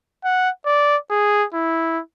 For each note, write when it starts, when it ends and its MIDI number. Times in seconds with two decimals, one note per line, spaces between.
0.25 0.50 78
0.66 0.97 74
1.10 1.45 68
1.54 2.00 64